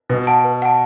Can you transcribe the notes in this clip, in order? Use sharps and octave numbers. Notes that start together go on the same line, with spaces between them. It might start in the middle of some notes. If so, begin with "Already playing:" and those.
B2 B4
F#5 A5
B4
F#5 A5